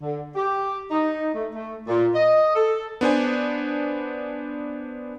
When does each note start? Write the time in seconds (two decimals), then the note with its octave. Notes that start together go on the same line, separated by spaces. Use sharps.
0.01 D3
0.35 G4
0.90 D#4
1.34 A3
1.54 A3
1.87 A#2
2.14 D#5
2.55 A4
3.01 B3 D4 C5 G#5